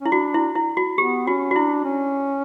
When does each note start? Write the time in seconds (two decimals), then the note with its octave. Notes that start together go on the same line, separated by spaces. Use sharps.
0.01 C#4 E4
0.12 D4 F#4
0.34 E4
0.55 E4
0.77 F#4
0.98 B3 G4
1.27 C#4 F#4
1.51 F#4
1.56 D4 E4
1.84 C#4